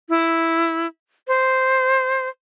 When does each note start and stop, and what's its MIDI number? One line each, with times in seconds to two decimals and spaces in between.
0.09 0.86 64
1.28 2.29 72